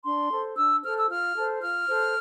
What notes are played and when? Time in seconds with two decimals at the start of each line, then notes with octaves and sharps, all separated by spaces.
0.04 D4 C6
0.30 A4 C5
0.57 D4 E6
0.82 A4 C5 F6
0.96 E6
1.09 F4 F6
1.35 A4 C5
1.62 F4 F6
1.88 A4 C5